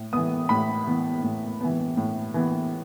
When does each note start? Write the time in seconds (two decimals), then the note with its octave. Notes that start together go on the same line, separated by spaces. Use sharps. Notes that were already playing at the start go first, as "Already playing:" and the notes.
Already playing: A2
0.13 E3 B3 D#6
0.49 A2 B5
0.87 E3 B3
1.23 A2
1.61 E3 B3
1.97 A2
2.34 E3 B3